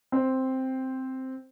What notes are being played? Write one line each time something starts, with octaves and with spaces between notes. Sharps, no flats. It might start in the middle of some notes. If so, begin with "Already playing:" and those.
C4 C5